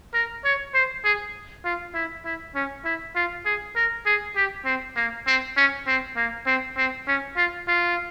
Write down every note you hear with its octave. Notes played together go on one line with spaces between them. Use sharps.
A#4
C#5
C5
G#4
F4
E4
E4
C#4
E4
F4
G#4
A#4
G#4
G4
C4
A#3
C4
C#4
C4
A#3
C4
C4
C#4
F4
F4